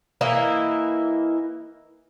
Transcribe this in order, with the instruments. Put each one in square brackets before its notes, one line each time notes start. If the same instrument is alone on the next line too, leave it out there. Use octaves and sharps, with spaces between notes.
[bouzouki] E3 A#3 E4 D#5